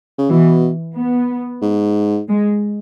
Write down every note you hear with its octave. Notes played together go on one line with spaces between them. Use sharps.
C#3
B2 E3
B3
G#2
G#3